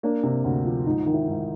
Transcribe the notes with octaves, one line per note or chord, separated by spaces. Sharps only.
A#3 D4
C3
D2
F3
G#2 D#4
D#3
E4
G#2